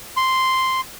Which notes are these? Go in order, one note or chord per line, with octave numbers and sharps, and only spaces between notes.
C6